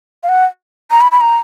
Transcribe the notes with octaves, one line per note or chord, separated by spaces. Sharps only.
F5
F#5
A#5
B5
B5
A#5